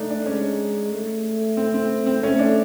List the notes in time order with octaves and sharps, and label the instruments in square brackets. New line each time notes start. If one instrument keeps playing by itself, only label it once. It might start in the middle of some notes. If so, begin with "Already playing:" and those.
Already playing: [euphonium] A3 [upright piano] D4 D#4
[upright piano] D4
[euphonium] G#3 [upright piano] C#4
[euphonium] A3
[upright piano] C4
C4
C4
[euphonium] A3 [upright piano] C#4
[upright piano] D4